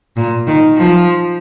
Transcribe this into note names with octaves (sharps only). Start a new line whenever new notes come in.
A#2
D#3
F3